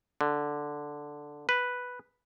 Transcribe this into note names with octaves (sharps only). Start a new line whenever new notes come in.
D3
B4